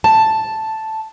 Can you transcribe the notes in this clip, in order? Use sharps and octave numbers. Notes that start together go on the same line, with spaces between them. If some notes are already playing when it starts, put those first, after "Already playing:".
A5